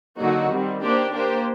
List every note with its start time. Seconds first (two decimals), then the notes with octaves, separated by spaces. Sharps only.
0.18 D3 F#3 A#3 D#4 F#4
0.50 D#3 G3 C4
0.82 A#3 D4 G4 C5
1.13 A#3 D4 G4 C5